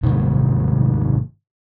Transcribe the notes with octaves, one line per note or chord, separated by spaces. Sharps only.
G#2 C3 D#3 A3